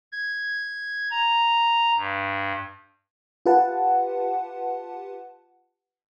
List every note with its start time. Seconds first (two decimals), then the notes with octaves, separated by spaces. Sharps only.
0.12 G#6
1.11 A#5
1.97 G2
3.46 F4 G4 B4 F#5 A5